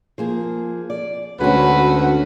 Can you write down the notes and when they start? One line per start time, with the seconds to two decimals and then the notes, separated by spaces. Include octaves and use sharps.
0.18 F3 A#3 G#4
0.90 D5
1.40 D2 G#3 C#4 F#4 B4